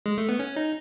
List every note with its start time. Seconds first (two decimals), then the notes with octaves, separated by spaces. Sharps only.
0.06 G#3
0.18 A3
0.29 B3
0.39 C#4
0.56 D#4